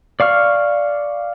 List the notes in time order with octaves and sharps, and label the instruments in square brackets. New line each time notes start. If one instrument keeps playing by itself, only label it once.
[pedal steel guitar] D5 F5 C#6 F6